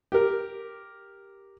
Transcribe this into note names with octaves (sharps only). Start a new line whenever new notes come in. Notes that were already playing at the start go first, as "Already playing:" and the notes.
G4 A#4